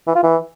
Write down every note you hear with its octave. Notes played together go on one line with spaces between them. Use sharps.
E3
F4
E3